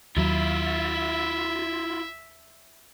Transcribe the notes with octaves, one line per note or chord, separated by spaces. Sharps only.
D#2 F#3 E4 F4 E5